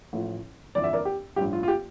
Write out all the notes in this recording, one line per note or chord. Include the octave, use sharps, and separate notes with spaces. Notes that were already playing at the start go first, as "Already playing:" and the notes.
A1 A2 F3
G1 F2 E3 D5
E5
A#4 D5
G4
A1 G2 F3 G4
F4
F4
G4